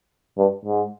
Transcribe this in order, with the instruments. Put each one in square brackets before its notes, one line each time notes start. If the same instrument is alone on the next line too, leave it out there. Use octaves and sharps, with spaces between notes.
[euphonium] G2
G#2